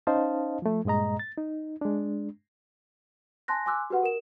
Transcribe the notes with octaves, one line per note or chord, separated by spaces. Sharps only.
C#4 D#4 C5 D#5 F5 A5
F3 A3
G2 A#2 G#3 D#5 A#5
A6
D#4
G#3 D4
G#5 A5 C6 F#6 A#6
G#5 C6 D6 E6 F#6
F#4 G4 B4 F#5
A#4 E7